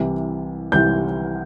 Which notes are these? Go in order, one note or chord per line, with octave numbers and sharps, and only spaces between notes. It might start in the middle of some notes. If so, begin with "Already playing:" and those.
Already playing: C2 C3 E3
C2 C3 E3 G6